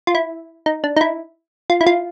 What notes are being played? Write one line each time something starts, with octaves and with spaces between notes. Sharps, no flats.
F4
E4
D#4
D4
D#4
E4
F4
E4
F4